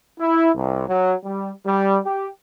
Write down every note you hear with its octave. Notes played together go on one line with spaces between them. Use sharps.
E4
C2
F#3
G3
G3
G4